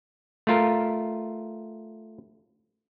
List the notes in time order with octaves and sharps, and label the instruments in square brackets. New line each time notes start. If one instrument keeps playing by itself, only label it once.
[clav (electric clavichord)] A3 F4 A#4